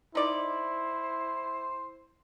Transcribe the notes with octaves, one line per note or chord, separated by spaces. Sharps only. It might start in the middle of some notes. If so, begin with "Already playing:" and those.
D#4 E4 C5 D5